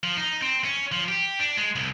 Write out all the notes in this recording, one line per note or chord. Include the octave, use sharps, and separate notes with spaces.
F3
D#4
C4
C#4
F3
G4
D4
G#3
C2